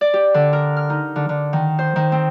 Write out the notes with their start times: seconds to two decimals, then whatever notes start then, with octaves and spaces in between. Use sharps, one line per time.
0.01 D5
0.14 G4
0.34 D3
0.53 A#4
0.77 F6
0.90 D#4
1.16 D3
1.29 D3
1.53 D#3
1.79 C5
1.96 D#3
2.12 C4